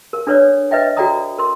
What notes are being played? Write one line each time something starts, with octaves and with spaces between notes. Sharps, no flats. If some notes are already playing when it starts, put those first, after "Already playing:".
A#4
D4 A4 B4 C#5 D5
B4 D#5 E5 G5
F#4 A4 D5 G5 A#5 D#6
A#4 C6